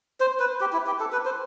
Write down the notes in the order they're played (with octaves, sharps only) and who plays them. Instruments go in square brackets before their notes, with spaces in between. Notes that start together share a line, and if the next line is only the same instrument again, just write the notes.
[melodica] C5
B4
G4
E4
G4
A4
B4
C5